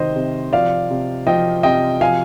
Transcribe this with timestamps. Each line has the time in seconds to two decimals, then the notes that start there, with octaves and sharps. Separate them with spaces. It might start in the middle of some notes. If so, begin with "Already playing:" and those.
Already playing: C3 D#3 C5 D#5
0.16 C3
0.53 F3 D5 F5
0.90 C3
1.27 F3 D#5 G5
1.63 C3 D#5 G5
2.00 F3 F5 G#5